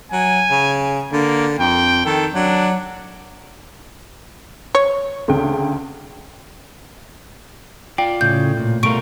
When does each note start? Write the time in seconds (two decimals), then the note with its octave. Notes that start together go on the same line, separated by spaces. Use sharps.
0.12 F#3 G#5
0.51 C#3
1.12 D3 A#3
1.59 F2 G5
2.06 D#3 A4
2.34 F#3 D4
4.75 C#5
5.28 D2 C#3 G5
7.98 F4 D5 G5
8.21 A2 C#3 G6
8.57 A#2
8.83 B2 G3 A3 F4 A#4 C#6 D7